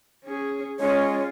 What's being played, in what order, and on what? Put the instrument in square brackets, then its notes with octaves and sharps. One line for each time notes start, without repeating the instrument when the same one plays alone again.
[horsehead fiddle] C#4 G#4
[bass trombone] G#3 [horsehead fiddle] C#4 F4 [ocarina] C#5